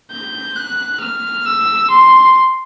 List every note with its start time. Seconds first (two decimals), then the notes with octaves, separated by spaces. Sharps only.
0.11 G6
0.56 F#6
1.01 F6
1.46 E6
1.90 C6